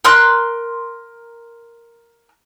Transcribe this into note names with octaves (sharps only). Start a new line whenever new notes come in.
A#4 C6 F#6